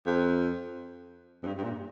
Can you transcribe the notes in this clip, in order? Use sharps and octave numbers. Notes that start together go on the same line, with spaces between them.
F2
F2
G2
G2
A#2